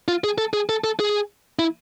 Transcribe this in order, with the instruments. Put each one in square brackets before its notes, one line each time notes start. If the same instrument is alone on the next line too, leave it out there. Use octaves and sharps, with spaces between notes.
[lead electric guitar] F4
G#4
A4
G#4
A4
A4
G#4
E4